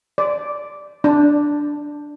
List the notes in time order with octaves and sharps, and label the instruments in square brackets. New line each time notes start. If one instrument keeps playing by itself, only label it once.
[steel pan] D5
D4